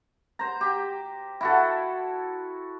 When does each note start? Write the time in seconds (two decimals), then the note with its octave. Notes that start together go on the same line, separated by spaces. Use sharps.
0.39 C5 A#5
0.61 G4
1.41 E4 F#4 A4